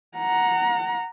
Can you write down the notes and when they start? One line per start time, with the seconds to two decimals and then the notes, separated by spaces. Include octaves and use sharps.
0.18 F#5 A#5